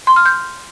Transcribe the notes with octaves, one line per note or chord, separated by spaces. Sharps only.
C6
F6
G6